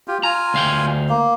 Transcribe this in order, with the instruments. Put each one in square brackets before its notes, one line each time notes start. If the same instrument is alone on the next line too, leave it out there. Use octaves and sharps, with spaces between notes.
[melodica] F4 G4
[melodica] F4 G#5 [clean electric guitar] A#5
[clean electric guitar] D2 F5 G5
[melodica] A#3